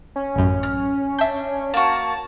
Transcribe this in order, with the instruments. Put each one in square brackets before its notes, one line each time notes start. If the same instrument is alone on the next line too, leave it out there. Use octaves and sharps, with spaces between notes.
[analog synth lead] C#4
[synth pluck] A1 F#2
[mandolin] F6
[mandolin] D4 [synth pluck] E5 G6
[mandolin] A#3 F#4 [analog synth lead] A5